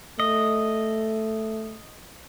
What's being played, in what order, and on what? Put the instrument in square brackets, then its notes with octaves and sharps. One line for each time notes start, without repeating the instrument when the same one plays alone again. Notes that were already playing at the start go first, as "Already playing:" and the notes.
[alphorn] A3 [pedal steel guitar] D#5